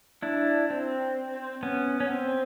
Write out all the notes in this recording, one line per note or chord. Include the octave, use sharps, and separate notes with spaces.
D4 E4
C4
B3 C#4
C#4
C4